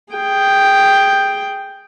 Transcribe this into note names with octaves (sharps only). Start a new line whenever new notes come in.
G#4 G5